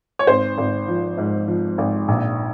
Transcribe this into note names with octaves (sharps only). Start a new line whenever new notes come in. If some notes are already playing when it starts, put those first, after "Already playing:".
C#5
G#1 C5
G#1
F3
G#2
F3
G#1
A#1